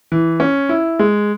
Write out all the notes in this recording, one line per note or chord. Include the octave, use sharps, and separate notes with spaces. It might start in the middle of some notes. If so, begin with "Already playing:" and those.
E3
C#4
E4
G#3